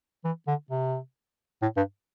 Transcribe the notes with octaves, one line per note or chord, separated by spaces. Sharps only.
E3
D3
C3
A2
G2